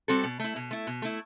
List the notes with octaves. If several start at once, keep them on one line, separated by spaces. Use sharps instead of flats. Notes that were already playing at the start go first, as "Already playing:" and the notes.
G3 C4 F#4 A4
B2
A3 E4
B2
A3 E4
B2
A3 E4